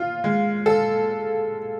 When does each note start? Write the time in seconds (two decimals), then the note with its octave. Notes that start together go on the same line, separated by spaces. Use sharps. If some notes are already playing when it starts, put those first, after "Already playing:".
Already playing: F4
0.24 G#3
0.66 A4